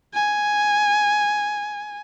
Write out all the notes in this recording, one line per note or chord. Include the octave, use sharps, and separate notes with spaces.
G#5